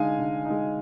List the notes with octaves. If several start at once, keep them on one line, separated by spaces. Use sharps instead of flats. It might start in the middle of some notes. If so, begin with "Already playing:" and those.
Already playing: D3 G#3 D#4 F5 G#5
D3
G#3 D#4